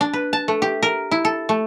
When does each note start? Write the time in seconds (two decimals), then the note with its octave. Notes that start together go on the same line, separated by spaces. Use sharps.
0.01 D4
0.13 B4
0.33 A5
0.48 A3
0.62 G4
0.83 A#4
1.11 E4
1.25 A4
1.49 A3